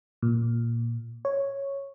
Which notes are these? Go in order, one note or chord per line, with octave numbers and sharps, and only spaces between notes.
A#2
C#5